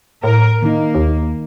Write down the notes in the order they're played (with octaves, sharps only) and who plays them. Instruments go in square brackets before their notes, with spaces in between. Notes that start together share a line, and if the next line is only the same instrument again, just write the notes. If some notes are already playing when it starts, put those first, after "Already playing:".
[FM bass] A2 [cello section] A#4
[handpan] D#3 D#4 [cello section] A#3
[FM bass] D#2